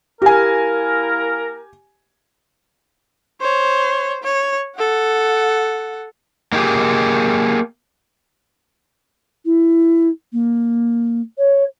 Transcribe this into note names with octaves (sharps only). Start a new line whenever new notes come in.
A#3 E4 G4 A#4 G#5
C5 C#5
C#5
A4 F#5
A#3 D#4 E4 G4 G#4
E4
A#3
C#5